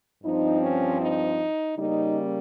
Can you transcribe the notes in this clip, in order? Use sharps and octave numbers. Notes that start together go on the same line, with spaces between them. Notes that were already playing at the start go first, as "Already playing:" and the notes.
G2 F3 C4 D#4
C#4
D#4
C#3 G3 A#3 C#4 D#4